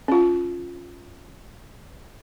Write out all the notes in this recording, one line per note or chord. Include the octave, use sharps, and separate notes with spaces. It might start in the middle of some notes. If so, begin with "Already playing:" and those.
C#4 F4